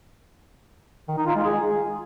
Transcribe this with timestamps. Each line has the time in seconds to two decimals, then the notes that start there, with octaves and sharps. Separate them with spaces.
1.09 D#3
1.18 D#4
1.27 F4
1.36 G#3
1.45 G#4